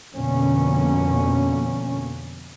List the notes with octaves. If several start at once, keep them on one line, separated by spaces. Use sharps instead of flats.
F2 B2 D3 A#3 C#4